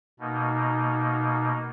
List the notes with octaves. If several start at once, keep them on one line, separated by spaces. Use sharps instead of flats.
B2 A#3 D#4